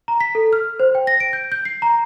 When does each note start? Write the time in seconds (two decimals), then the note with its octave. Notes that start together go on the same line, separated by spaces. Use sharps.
0.08 A#5
0.20 B6
0.35 A4
0.53 F6
0.80 C5
0.95 G5
1.07 A#6
1.20 D7
1.33 G6
1.52 G6
1.65 C7
1.82 A#5